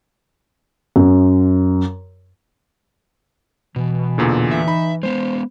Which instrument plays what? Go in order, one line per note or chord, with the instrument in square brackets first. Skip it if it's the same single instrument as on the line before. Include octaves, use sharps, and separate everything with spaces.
[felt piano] F#2
[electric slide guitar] B2 [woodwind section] E3
[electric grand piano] E2 A#2 D3
[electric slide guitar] E5
[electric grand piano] D#4 B5
[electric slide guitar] G#3 B3 [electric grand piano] C5